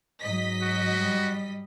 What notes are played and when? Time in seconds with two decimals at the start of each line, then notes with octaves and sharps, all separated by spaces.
0.21 G#2 F#3 D#5 B6
0.62 F#4
0.98 G3